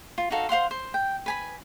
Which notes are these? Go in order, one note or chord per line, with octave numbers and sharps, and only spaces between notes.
F4
D#4 F#4 A4 F5
C5 F5 F#5 C6
C5
G5
B4 G#5 B5